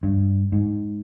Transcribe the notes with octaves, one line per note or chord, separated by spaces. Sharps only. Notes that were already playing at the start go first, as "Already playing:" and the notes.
G2
G#2